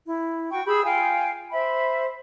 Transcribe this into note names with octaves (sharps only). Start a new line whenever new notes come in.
E4
F#4 G5 C#6
G4 G#4 B5 E6
F4 F5 G5 G#5
C5 E5 B5